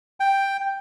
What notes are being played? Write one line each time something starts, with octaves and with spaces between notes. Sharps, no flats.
G5